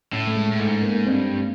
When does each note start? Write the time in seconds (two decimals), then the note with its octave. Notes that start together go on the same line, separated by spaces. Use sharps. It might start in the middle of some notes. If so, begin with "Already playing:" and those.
0.12 A2 C#4
0.27 A3
0.36 G#3
0.52 A2
0.59 G#2 A3
0.83 A#3
1.06 G2 C4